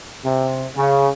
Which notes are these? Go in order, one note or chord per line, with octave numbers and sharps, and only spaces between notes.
C3
C#3